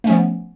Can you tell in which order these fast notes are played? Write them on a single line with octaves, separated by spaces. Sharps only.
A3 C#4 F3 B3